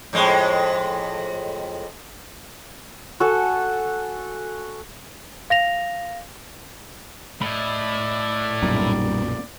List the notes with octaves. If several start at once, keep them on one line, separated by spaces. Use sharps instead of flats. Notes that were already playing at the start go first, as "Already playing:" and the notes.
F2 A2 G#3
F#4 A4 G#5
F5 A#6 F7
A2 E4 D5 D#5 B5
B1 F#2 A#2 G3 D#4